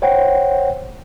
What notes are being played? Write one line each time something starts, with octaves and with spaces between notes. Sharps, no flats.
C5 C#5 F#5 G5